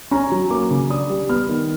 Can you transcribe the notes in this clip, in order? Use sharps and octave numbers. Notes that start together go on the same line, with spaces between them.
C#4 A#5
F#3
A#3 D6
C#3
D4 D#6
G3
B3 F6
D#3